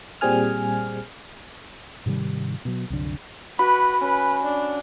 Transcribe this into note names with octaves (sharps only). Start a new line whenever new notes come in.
A#2 G3 C4 G#4 G#5 F6
G#2 C3 D#3 G3
B2 F#3
C2 F#2 D3
F#4 B4 B5
C#4 B4
D4